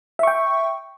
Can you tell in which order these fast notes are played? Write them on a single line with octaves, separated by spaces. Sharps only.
E5 C#6 G5